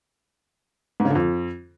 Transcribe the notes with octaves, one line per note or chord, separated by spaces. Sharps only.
G#2
C#3
D3
F2